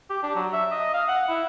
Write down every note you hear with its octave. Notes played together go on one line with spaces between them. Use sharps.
G4
D4
F#3
E5
D#5
F5
F#5
E4